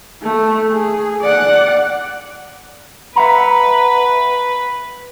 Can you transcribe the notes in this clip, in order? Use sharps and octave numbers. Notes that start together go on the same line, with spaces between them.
A3
G#4
D5 F#5
B4 E5 F#5 A#5